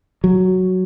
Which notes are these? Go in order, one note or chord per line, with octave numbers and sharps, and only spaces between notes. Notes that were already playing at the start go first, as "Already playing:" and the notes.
F#3